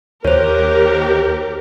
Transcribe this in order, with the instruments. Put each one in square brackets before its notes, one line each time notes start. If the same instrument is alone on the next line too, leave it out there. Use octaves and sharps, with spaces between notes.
[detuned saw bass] D#2 [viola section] G4 A#4 [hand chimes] C5 C#5